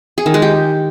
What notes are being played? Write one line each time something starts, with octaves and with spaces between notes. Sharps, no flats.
G#4
D#3
G#3
G4